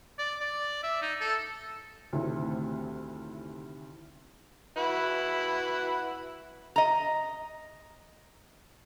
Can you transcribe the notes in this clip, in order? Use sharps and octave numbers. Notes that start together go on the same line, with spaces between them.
D5
D5
E5
D#4
A4
D2 A2 C3 D#3 A3 C4
E4 F#4 B4
D#5 A#5